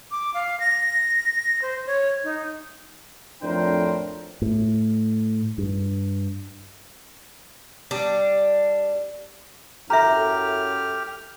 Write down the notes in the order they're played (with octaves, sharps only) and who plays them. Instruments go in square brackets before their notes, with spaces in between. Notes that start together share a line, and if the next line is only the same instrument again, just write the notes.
[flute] D6
F5
A#6
C5
C#5
D#4
[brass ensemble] F2 A2 D4 A#4 C5 G5
[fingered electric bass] A2
G2
[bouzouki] G3 D4
[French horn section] F#2 E4 A4 [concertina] G4 F6 [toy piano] E5 A#5